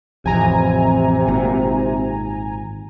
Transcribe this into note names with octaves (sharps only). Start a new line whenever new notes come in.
A1 F2 C3 G#5 A#5
G#1 A#2